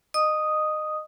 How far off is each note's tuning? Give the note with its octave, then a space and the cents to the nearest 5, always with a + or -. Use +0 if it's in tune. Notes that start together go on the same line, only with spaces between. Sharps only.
D#5 -25 D#6 +0